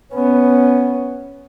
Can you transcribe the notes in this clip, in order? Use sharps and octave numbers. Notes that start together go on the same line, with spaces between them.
B3 C#4